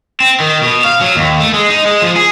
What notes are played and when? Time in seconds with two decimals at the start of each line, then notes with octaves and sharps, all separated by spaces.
0.20 C4
0.40 D#3
0.62 B2
0.84 F5
1.01 F#3
1.16 D#2
1.40 A3
1.54 G#3
1.70 D#4
1.86 G#3
2.02 F3
2.16 G#4